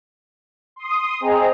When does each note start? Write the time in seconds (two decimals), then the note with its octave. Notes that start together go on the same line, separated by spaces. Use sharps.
0.76 C6 D#6
1.20 C4 G#4 C5 D#5 A#5